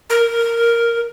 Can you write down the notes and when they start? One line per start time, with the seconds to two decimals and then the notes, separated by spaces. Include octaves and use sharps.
0.10 A#4